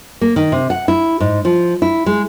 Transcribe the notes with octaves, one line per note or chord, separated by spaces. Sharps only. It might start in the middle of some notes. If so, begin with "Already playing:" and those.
A#3
D#3
C3
F#5
E4
G#2
F3
E4
G#3